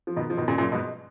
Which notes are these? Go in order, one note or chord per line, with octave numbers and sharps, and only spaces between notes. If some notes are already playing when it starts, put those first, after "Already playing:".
F3
B2 D#3
F3
B2 D#3
A#2 C#3
F#2 A#2
G#2 B2